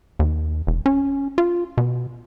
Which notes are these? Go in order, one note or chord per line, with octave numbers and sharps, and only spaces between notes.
D#2
E1
C#4
F4
B2